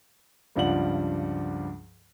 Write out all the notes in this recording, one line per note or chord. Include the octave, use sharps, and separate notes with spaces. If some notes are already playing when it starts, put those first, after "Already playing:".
C#2 G2 F3 D5 F#5 F#7